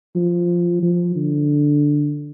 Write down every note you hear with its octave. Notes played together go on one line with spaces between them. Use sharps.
F3
F3
D3